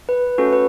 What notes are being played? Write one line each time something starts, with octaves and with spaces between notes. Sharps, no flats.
B4
A3 C#4 F#4 A4 B4
B4